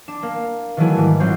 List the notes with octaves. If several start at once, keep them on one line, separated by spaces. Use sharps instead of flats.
D4 E7
A#3
D#3 E3 F#3 A3 E4 G#4
G#2 E3 G3
A#1 F#3 C4 G6 C7